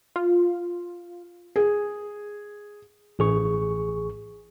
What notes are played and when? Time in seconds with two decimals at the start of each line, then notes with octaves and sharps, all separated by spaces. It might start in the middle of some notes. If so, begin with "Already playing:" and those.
0.16 F4
1.56 G#4
3.19 A1 G#4 C#6